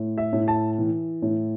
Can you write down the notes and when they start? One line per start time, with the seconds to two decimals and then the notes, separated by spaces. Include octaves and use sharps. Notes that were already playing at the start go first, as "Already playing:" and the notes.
Already playing: A2
0.18 E5
0.33 A2
0.48 A5
0.79 E3
1.22 A2